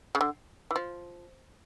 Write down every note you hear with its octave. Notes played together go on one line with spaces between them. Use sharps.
C#3
D3
E3
F3